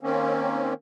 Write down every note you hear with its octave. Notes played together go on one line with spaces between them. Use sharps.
D#3 A#3 C4 C#4